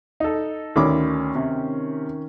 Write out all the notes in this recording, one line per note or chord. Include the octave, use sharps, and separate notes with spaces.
D#4 A4
D2 D#3 C#4 B5 D6
C3